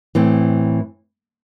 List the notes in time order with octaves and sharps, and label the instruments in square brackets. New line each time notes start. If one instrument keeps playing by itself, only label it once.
[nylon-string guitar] A2 E3 C4